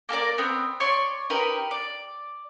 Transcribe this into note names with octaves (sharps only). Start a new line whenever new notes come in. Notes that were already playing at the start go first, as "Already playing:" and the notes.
A#3 A4 A#4 D5
B3 C4
C#5 D5 C6 C#6
D#4 G4 A#4 B4
D5